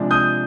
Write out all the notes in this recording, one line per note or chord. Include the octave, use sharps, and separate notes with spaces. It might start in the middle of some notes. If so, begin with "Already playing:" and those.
Already playing: C3 F3 G#3 D4
D#6 G6